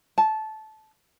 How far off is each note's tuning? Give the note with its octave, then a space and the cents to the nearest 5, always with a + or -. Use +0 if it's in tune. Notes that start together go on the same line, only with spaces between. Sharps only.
A5 -15